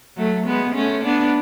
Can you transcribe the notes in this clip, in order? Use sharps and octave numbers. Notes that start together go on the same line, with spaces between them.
F#3 A3
G#3 B3
A3 C#4
B3 D4